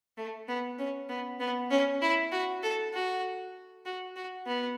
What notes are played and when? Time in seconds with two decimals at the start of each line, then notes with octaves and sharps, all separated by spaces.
0.18 A3
0.48 B3
0.79 C#4
1.09 B3
1.40 B3
1.71 C#4
2.02 E4
2.32 F#4
2.63 A4
2.93 F#4
3.86 F#4
4.16 F#4
4.46 B3